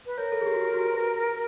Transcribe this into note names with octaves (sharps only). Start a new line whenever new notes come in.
B4
A#4 C#5
A4
G#4
G4
F#4
G4
F#4
B4